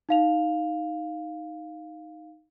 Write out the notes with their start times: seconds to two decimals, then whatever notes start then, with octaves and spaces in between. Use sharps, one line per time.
0.09 D#4 F5 F7